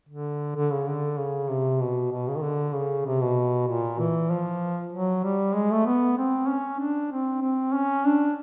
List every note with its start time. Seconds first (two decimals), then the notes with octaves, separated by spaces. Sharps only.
0.09 D3
0.56 D3
0.71 C#3
0.88 D3
1.18 C#3
1.49 C3
1.80 B2
2.12 B2
2.28 C#3
2.36 D#3
2.43 D3
2.75 C#3
3.06 C3
3.21 B2
3.68 A#2
3.99 E3
4.31 F3
4.93 F#3
5.24 G3
5.55 G#3
5.71 A3
5.86 B3
6.18 C4
6.48 C#4
6.80 D4
7.12 C4
7.42 C4
7.73 C#4
8.05 D4